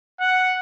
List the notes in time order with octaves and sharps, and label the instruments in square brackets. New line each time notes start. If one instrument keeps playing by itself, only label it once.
[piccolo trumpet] F#5